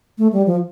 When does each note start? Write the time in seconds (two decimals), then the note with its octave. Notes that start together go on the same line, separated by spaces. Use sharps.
0.18 A3
0.33 G3
0.47 F3